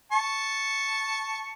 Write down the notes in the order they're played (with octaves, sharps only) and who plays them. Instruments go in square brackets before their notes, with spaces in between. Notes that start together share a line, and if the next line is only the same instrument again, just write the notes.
[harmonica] A5 C#6